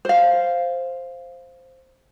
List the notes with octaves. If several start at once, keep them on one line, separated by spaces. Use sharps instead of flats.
C5 F5